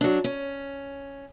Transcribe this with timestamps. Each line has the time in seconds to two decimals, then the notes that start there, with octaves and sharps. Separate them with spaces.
0.01 F#3 D4
0.24 C#4